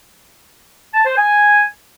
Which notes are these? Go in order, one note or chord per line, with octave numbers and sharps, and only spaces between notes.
A5
C5
G#5